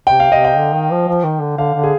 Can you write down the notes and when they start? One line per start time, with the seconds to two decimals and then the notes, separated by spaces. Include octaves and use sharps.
0.07 C3 G5
0.20 F5
0.32 C3 D#5
0.45 G5
0.57 D3
0.74 D#3
0.91 F3
1.08 F3
1.24 D#3
1.41 D3
1.57 D3 F5
1.75 D3
1.83 G#4